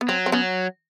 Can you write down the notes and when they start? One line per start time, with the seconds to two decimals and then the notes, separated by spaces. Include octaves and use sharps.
0.01 B3
0.08 F#3 C4
0.26 C4
0.32 F#3 B3 C#4